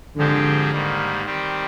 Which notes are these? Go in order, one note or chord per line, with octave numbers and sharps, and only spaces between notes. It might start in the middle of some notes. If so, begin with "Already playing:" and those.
G#2 D3 F3 G#3 C4 G4
G#2 D#3 G3 A#3
D#3 G3 C4 G4